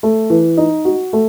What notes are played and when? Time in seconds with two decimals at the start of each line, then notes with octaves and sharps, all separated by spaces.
0.03 A3
0.30 E3
0.57 D#4
0.85 F#4
1.13 A3